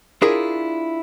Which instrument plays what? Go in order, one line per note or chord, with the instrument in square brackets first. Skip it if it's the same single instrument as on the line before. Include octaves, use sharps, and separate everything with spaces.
[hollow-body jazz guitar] D4 E4 F4 G#4 A#4